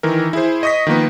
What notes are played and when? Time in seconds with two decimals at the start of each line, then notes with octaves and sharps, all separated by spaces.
0.03 D#3 E3 A#4
0.33 E4 G#4 C5
0.63 D#5 C#6 D#6 A#6 B6
0.87 D#3 F3 A#3 B3